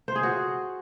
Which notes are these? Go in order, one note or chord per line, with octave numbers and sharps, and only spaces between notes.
C5
G#4
F#4